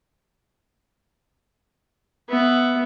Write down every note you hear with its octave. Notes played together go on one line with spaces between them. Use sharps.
B3 E5